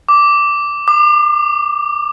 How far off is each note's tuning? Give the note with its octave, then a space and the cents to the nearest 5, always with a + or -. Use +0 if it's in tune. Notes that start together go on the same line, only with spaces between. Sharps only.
D6 -10
D6 +35